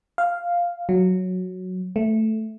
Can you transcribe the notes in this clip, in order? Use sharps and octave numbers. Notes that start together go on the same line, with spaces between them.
F5
F#3
A3